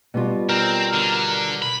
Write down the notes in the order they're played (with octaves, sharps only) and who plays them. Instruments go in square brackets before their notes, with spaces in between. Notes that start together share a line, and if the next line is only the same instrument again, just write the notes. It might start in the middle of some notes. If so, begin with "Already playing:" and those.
[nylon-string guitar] B2 G3 F4
[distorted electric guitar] C4 [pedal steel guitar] A#4
[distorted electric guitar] D3
B5